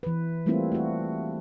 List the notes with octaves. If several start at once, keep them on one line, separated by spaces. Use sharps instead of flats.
E3 B4
G3 A3 A#3 C4 E4 F4
A3 F#4